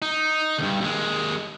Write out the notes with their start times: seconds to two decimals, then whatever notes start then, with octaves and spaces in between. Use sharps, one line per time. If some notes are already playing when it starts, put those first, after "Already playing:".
0.02 D#4
0.58 D2 G2
0.81 D#2 G#3